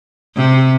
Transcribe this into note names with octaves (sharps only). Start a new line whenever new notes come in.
C3